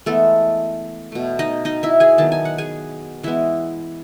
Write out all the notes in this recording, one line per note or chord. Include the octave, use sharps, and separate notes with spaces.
E3 G#3 A3 B3 A4
B2 A3
D#4 D#5
D#4 D#5
E4 E5
G#4 G#5
D#3 F#3 B3 A5
G#5
F#5
G#4 G#5
E3 G#3 B3 E4 E5